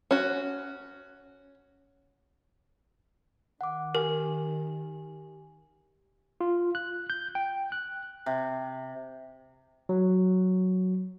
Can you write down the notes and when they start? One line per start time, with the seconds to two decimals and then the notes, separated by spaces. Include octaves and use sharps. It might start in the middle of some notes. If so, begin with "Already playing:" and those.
0.11 C#4 F#4
3.61 D#3 F#5 D6
3.95 G4 A#4 G#5
6.41 F4
6.75 F#6
7.10 G6
7.35 G5
7.72 F#6
8.26 C3
9.89 F#3